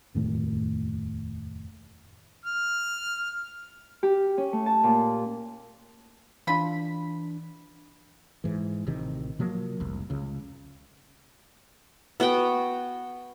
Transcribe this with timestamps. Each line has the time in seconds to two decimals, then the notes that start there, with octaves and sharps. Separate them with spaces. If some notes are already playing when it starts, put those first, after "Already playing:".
0.15 F1 D#2 A2
2.44 F6
4.03 G4
4.38 C#4
4.53 A3
4.66 A5
4.84 A#2
6.47 E3 D4 F4 B5
8.44 G#2 E3
8.87 A1 C3 D#3
9.39 C3 F3 F#3 A#3
9.80 F1 C2
10.10 C#2 C#3
12.20 B3 F#4 F#5 G5